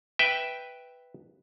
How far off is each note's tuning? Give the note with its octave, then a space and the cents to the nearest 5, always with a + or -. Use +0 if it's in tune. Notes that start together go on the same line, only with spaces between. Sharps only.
B4 +0 E5 +0 G5 +0